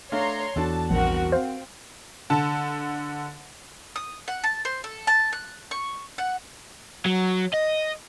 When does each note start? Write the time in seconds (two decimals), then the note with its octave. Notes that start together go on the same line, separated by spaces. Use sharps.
0.12 A3 D4 C#5 F5 A#5 C6
0.56 E2 D4 F#4 A4 A5
0.91 A#1 G2 C4 F#4 A#4 F#5
1.32 C4 C5 F5
2.30 D3 A5
3.96 D#6
4.28 F#5
4.44 A5
4.65 C5
4.84 A4
5.07 A5
5.33 F#6
5.71 C#6
6.18 F#5
7.06 F#3
7.54 D#5